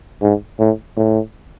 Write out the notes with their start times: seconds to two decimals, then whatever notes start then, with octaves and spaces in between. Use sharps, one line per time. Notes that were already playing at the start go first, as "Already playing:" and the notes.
0.22 G#2
0.59 A2
0.97 A2